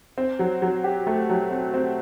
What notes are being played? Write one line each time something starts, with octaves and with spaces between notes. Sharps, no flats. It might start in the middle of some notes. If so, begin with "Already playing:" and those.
C4
F#3
F#3
G4
A3
F#3
C4
C4